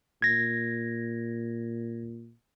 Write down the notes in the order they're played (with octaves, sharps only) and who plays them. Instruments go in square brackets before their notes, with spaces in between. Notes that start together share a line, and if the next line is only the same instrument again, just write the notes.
[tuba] A#2 [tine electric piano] G#6 A#6